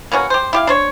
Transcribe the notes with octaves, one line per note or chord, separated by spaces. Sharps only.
A#3 B3 C#4 F#4
G4 C5
E4 G4 F5
D4 C5 C#5